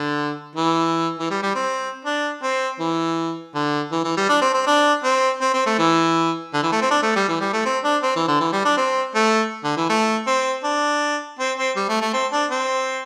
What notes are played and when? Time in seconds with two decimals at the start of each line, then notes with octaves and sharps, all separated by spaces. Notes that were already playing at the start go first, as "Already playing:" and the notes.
Already playing: D3
0.55 E3
1.19 E3
1.30 G3
1.43 G3
1.55 C4
2.05 D4
2.43 C4
2.79 E3
3.55 D3
3.92 E3
4.04 E3
4.17 G3
4.29 D4
4.41 C4
4.54 C4
4.66 D4
5.04 C4
5.41 C4
5.54 C4
5.66 A3
5.78 E3
6.54 D3
6.63 E3
6.72 A3
6.81 C4
6.91 D4
7.03 A3
7.16 G3
7.28 E3
7.40 G3
7.53 A3
7.65 C4
7.84 D4
8.03 C4
8.16 E3
8.28 D3
8.40 E3
8.53 G3
8.65 D4
8.77 C4
9.15 A3
9.64 D3
9.77 E3
9.89 A3
10.27 C4
10.64 D4
11.39 C4
11.58 C4
11.76 G3
11.89 A3
12.01 A3
12.13 C4
12.32 D4
12.51 C4